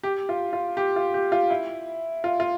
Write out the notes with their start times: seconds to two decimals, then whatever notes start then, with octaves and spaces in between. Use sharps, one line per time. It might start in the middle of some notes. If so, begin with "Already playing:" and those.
0.03 G4
0.29 F4
0.53 F4
0.77 G4
0.96 F4
1.14 G4
1.32 F4
1.50 E4
2.24 F4
2.40 F4